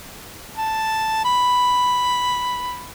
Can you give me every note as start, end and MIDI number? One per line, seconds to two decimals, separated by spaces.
0.58 1.20 81
1.24 2.86 83